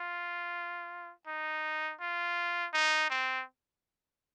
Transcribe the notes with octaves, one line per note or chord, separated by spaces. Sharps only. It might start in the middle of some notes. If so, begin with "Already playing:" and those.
Already playing: F4
D#4
F4
D#4
C4